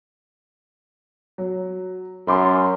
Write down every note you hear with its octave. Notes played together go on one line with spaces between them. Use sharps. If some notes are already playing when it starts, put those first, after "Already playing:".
F#3
F#2 B5 C6 D6